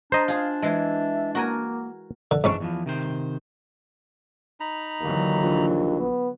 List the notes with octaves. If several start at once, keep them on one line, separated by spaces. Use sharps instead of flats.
D4 C5 D#5 A#5
F4 G#4 F5
E3 G#3 E5
A#3 F#4 A#4 G#5
D3
G#2 E3 C#4 D4 C#6
E2 E3 F3
C3 D#3 C5
D#4 A#5 B5
D#2 D3 E3 F#3
A#1
B3